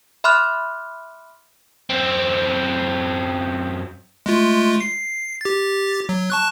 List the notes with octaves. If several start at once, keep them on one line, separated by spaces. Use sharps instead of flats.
E5 B5 C6 D6 F6 F#6
F#2 C4
G#3 A3 F4
C7
G4 A6
F#3
A5 C#6 F#6